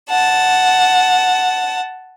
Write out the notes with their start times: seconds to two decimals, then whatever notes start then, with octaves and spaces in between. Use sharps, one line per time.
0.10 F#5 A5